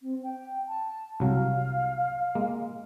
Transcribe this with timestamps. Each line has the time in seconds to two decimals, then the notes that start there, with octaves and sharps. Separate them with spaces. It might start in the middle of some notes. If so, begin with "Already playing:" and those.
0.01 C4
0.23 G5
0.68 A5
1.20 C2 F#3 F5
2.35 G#3 A#3